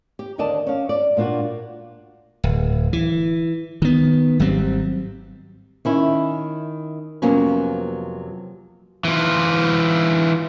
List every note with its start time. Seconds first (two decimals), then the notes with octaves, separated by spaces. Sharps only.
0.19 G4
0.38 D#2 D3 A#4 D5 D#5 A5
0.67 C#4 F5
0.89 D5
1.17 A#2 A#3 D4 F4 F#4
2.44 D1
2.93 E3
3.82 D#3 B3
4.40 G#1 F#3 G3 C4
5.85 D#3 C#4 E4
7.22 F2 C3 F#3 A#3 B3 C#4
9.05 E3 F4